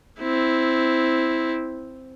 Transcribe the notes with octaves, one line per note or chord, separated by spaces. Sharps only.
C4 E4